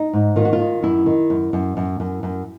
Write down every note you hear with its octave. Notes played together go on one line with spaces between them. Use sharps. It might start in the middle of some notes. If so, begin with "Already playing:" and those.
Already playing: D#4
G#2
D#3 F4
F#4
F4
D#3
F#2 E4
D#3
F#2
F#2
F#2
F#2
F#2